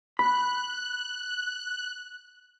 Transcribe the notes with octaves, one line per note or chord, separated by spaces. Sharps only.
B5 F#6